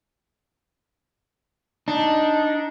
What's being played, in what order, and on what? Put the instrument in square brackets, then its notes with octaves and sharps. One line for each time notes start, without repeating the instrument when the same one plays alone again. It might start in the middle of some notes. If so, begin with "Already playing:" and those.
[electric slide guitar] D4 [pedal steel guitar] D#4